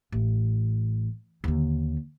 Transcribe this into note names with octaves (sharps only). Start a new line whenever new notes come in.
A1
D#2 D3